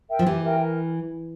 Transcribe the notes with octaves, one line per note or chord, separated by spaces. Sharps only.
A#4 E5 G5
F3
E3 G4
A#4 E5 G5
A#4